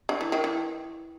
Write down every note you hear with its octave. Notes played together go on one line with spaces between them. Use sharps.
D3
E3
D#3
E3